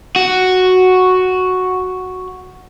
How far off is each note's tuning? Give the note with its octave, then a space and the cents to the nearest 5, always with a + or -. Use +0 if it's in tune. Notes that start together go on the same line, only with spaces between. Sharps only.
F#4 +0